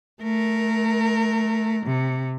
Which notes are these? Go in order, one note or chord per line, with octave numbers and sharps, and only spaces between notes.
A3 A#4
C3